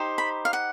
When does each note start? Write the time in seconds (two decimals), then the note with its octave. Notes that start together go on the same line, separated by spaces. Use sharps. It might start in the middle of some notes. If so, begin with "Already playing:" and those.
Already playing: D#4 G4 C5
0.18 B5
0.45 F5
0.53 F#5